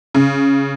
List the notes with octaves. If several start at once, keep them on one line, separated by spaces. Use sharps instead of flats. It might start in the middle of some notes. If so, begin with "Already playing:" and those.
C#3